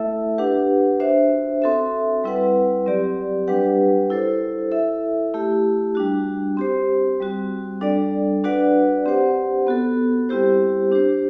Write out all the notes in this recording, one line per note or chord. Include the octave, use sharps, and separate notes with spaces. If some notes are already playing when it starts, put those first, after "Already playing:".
Already playing: A3 E4 A4 E5
D4 G4 B4 F#5
D4 F#4 C5 E5
C4 F#4 A4 E5
G3 C4 E4 B4 F#5
F#3 C4 G4 D5
G3 D4 G4 B4 F#5
E4 A4 C5
E4 A4 E5
A3 E4 G4
G3 D4 F#4
C4 G4 C5
G3 C4 F#4
G3 D4 A4 D5
D4 F#4 B4 D5 F#5
C4 G4 C5 F#5
B3 F#4 A4
G3 C4 E4 G4 C5
D4 G4 C5